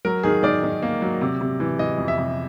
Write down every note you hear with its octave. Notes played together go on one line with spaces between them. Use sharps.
F#3 A#4
D#3 G#4
D#3 D5
D#3
A#3
F#3
C3
C3
E3
E3 D#5
F2
E5
C3